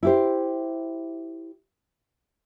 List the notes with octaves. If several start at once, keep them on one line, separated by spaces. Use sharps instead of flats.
E4 G4 C5